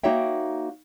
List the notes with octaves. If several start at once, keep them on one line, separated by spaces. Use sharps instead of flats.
A#3 D#4 F#4 C#5 E5 G5